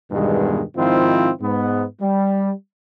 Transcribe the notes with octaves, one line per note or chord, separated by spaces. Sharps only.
E2 G2 B2 D#3 G3 G#3
G#2 D#3 F3 C4 E4 F4
G#2 B3
G3